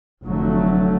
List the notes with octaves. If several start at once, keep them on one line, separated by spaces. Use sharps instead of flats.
F1 D3 F#3 A3